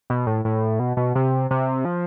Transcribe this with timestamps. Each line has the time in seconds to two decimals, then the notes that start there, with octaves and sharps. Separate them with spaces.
0.10 B2
0.27 A2
0.45 A2
0.80 B2
0.97 B2
1.15 C3
1.51 C3
1.85 F3